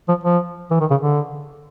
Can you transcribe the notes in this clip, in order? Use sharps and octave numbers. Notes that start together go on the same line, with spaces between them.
F3
F3
E3
D#3
C#3
D3